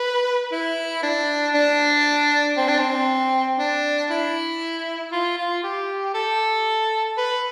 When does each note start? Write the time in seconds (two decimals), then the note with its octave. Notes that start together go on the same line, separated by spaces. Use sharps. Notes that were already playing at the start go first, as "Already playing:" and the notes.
Already playing: B4
0.52 E4
1.03 D4
1.54 D4
2.57 C4
2.68 D4
2.79 C4
3.58 D4
4.10 E4
5.12 F4
5.38 F4
5.64 G4
6.14 A4
7.18 B4